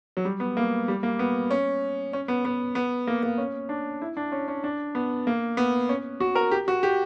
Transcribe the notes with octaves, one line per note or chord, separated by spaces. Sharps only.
F#3
G3
B3
A#3
G3
A#3
B3
C#4
C#4
B3
B3
B3
A#3
A#3
C#4
D4
E4
D4
C#4
C#4
D4
B3
A#3
B3
C#4
F#4
A#4
G4
F#4
G4